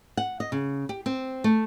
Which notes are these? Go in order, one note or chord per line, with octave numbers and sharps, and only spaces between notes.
F#5
D#5
C#3
G4
C4
A3